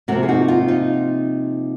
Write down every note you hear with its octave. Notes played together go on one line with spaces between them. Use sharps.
C3 F3 A#3 F#4 A#4
G#4
D#4 F#4
F4
D#4